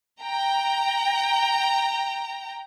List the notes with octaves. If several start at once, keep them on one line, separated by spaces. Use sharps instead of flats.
G5 A#5